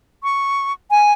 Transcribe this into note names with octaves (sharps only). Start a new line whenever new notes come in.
C#6
G#5